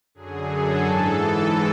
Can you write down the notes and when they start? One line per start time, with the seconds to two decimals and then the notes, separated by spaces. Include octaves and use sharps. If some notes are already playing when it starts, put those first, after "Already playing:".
0.15 F#2 D3 F#3 G#4
0.49 A4
0.84 G#2 E3 A4